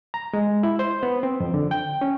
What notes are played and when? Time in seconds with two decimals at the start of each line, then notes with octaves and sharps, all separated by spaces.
0.14 A#5
0.33 G#3
0.63 E4
0.79 C5
1.03 B3
1.23 C4
1.40 F2
1.54 D3
1.71 G5
2.01 C#4